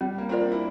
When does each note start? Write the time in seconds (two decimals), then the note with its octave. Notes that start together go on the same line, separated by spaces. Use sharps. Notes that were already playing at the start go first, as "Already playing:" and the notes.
0.01 G3 C4
0.18 A#3
0.29 C4 F4 A#4 D5
0.40 D4
0.52 E4